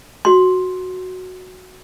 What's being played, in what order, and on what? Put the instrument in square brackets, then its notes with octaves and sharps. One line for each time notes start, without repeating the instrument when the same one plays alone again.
[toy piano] F#4 C6